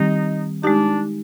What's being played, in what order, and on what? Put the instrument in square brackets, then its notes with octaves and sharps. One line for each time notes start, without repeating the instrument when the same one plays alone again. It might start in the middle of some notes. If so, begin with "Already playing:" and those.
Already playing: [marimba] D#3 G3 C4 G4 [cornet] D#4
[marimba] G#3 D#4 G4 [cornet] D4